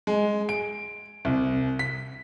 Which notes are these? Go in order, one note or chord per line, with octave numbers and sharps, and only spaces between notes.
G#3
D7
C2
B6